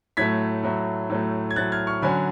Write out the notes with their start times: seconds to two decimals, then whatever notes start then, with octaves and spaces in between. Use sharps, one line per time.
0.17 A2 F#3 A3 G#6 B6
0.63 A2 F#3 A3
1.10 A2 F#3 A3
1.51 G#6
1.56 A2 F#3 A3 F#6 A6
1.72 F6 G#6
1.87 C#6 F6
2.02 D3 F#3 C#4 G#5 B5